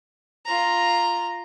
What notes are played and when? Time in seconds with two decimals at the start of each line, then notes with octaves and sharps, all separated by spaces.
0.45 F4 A#5